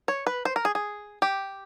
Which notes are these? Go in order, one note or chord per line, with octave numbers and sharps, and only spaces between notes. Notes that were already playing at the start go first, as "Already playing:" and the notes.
C#5
B4
C5
A#4
G#4
G#4
G4